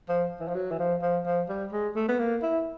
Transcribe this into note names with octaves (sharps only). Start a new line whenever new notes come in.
F3
E3
F3
F#3
E3
F3
F3
F3
G3
G#3
A3
B3
A#3
E4